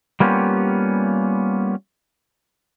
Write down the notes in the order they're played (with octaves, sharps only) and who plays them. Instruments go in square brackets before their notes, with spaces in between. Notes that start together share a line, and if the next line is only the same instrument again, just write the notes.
[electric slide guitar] G3 A#3 B3 C#4 F4 G4